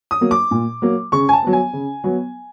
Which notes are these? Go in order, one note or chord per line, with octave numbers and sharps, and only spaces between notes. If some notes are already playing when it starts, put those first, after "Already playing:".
D#6
F#3 A#3
D6
A#2
F#3 A#3
C#3 C#6
G#5
A5
F#3 B3
G#5
C#3
F#3 B3